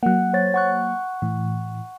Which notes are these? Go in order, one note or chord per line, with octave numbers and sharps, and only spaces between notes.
F#3 A#3 F#5 F#6
C5 C#5 A6
F#5 C#6 F#6
A2 E3